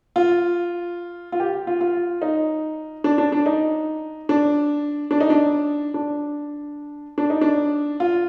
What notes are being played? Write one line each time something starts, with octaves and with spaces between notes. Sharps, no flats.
F4
F4
G4
F4
F4
D#4
D4
D4
D4
D#4
D4
D4
D#4
D4
D4
D4
D#4
D4
F4